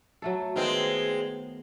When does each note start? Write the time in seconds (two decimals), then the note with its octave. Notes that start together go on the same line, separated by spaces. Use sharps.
0.22 F#3 A3 A4
0.56 D#3 G#3 B3 C4 F4